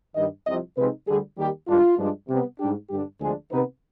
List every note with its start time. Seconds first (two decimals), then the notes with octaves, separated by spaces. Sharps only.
0.16 G2 D#3 G3 D#5
0.47 C2 C3 F3 D#5
0.77 C3 F3 G#3 C4 D#4 B4
1.07 D2 D3 G3 G#4
1.38 D#2 D#3 G3 G4
1.68 G2 D#3 G#3 D4 F4
1.98 G2 F3 G#3 D4
2.29 C3 G3 B3
2.59 G#2 G3 D4 G4
2.90 G2 D3 G3 D4 G4
3.20 D2 C3 F3 G#3 D4 G#4
3.51 C3 D#3 B3 D#4 B4